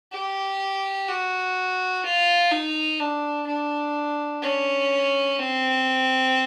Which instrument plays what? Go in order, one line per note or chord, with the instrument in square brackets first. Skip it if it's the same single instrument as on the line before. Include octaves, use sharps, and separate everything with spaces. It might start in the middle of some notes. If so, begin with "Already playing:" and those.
[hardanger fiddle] G4
F#4
F4
D#4
D4
D4
C#4
C4